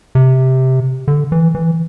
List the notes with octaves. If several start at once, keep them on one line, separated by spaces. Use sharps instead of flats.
C3
D3
E3
E3